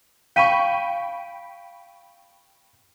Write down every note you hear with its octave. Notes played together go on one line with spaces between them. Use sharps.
F5 G5 B5 C#6 B6 D#7